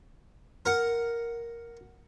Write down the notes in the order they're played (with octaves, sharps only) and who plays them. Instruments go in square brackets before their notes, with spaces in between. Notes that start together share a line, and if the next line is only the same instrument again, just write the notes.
[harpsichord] A#4 F#5